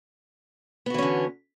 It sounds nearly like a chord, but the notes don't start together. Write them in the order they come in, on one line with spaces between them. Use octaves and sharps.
B3 F#4 E3 C#4 D3